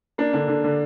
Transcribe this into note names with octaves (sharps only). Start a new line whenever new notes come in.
A#3 D4
D3 D4
D3
D3